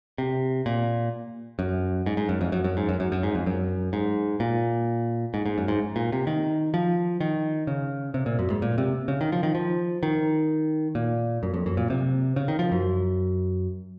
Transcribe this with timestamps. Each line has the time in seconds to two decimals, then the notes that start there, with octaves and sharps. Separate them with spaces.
0.18 C3
0.66 A#2
1.59 F#2
2.06 G#2
2.17 G#2
2.29 F#2
2.41 F2
2.52 F#2
2.64 F#2
2.77 G#2
2.89 F#2
3.00 F#2
3.12 F#2
3.23 G#2
3.35 F2
3.46 F#2
3.93 G#2
4.40 A#2
5.34 G#2
5.46 G#2
5.58 F#2
5.68 G#2
5.96 A#2
6.12 C3
6.27 D#3
6.74 F3
7.21 D#3
7.67 C#3
8.14 C3
8.26 A#2
8.39 F#2
8.50 G#2
8.62 A#2
8.78 C3
9.08 C#3
9.21 D#3
9.32 F3
9.43 D#3
9.55 F3
10.03 D#3
10.95 A#2
11.43 F#2
11.54 F2
11.66 F#2
11.77 A#2
11.90 C3
12.36 C#3
12.48 D#3
12.59 F3
12.72 F#2